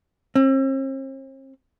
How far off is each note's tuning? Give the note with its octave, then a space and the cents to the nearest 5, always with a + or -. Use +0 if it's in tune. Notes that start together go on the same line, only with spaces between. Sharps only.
C4 +45